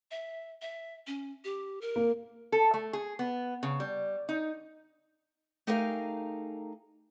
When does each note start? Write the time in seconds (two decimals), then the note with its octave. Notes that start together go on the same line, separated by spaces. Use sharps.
0.11 E5
0.62 E5
1.07 C#4
1.44 G4
1.81 A#4
1.96 A#3
2.52 A4
2.74 A3
2.93 G#4
3.19 B3
3.63 C#3
3.80 G3
4.29 D#4
5.67 A3 D#4 G4 G#4 A#4 F5